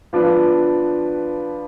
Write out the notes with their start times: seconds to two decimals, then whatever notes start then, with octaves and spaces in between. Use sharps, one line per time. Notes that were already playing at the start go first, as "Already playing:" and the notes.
0.13 F3 B3 D4 F4 B4